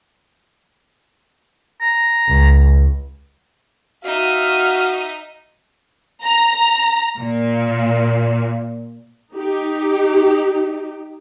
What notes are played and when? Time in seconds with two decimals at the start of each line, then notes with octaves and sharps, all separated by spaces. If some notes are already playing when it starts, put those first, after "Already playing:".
1.81 A#5
2.28 C#2
4.04 D#4 F#4 E5 F5 D#6
6.23 A#5
7.18 A#2
9.33 D#4 G4